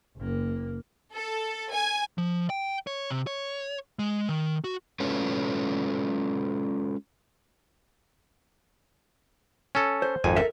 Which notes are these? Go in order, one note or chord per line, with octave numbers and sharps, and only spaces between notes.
F#1 A#3
A4
G#5
F3
G5
C#5
C3
C#5
G#3
D#3
F#4
G#3 C#4 F4 A4 B4 C#5
C#4 A4
C5
G#1 F2 G#5
A4 A#4 E5